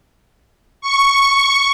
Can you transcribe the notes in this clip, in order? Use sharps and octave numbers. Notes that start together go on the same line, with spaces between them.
C#6